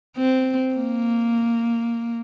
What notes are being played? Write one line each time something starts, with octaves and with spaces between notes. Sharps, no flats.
C4
A#3